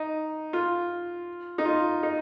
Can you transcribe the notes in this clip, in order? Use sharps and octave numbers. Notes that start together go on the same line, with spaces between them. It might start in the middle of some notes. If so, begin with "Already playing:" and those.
Already playing: D#4
F4
D#4
F4
D#4